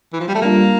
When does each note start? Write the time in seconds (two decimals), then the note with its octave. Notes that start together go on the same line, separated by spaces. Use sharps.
0.13 E3
0.20 F3
0.28 G3
0.35 A3
0.42 G3 A#3 D4 F4